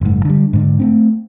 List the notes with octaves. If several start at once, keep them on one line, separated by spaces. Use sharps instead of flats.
F#1 G#2
D3 G3
G#2 D3
A3 B3 C4